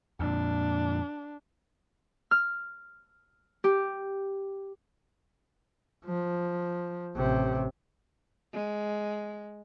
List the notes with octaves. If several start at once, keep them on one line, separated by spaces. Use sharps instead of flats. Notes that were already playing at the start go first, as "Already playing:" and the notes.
F2 A#2 D4
F6
G4
F3
A1 C3
G#3